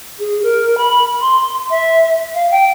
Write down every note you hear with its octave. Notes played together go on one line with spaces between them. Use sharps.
G#4
A#4
B5
C6
E5
F5
G5